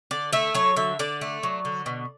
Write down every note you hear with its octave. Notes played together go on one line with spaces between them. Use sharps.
D3 D5
A3 E5
F#3 C#5
D3 E5
D3 D5
A3
F#3
D3
B2